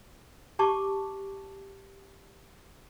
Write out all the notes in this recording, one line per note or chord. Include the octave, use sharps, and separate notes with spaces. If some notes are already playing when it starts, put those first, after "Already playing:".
G4 A5 C#6 D6